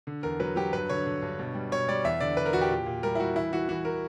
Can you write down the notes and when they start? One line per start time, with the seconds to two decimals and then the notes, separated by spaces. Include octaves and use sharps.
0.07 D3
0.23 E2 A#4
0.40 F#3 B4
0.56 F#3 G4
0.73 G2 B4
0.89 D3 C#5
1.06 D3
1.22 G2
1.39 B2
1.55 G3
1.72 B2 C#5
1.88 G3 D5
2.04 E2 E5
2.21 D3 D5
2.37 D3 B4
2.46 A#4
2.53 E2 F#4
2.61 G4
2.70 A#2
2.86 A#2
3.03 G3 A#4
3.15 E4
3.20 G3 F#4
3.36 E3 E4
3.52 E3 F#4
3.69 E3 F#4
3.85 E3 A#4